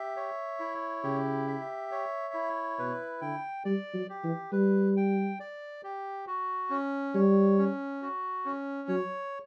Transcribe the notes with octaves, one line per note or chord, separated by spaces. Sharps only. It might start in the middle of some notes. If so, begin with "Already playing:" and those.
Already playing: G4 E5
C#5
E4
C#3 G4
E5
C#5
E4
B2 B4
D3 G5
G3 D5
F#3
G4
E3
G3 B4
G5
D5
G4
F#4
C#4
G3 C#5
C#4
F#4
C#4
F#3 C#5